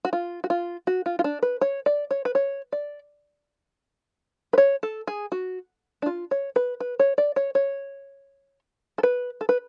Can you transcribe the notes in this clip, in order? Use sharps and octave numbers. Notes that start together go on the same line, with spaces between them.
F#4
F4
F#4
F4
F#4
F4
F4
D4
B4
C#5
D5
C#5
B4
C#5
D5
B4
C#5
A4
G#4
F#4
D4
F4
C#5
B4
B4
C#5
D5
C#5
C#5
A4
B4
A4
B4